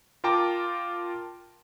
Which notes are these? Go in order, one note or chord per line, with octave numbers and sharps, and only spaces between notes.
F4 A#4 G5 A5 A#5 D6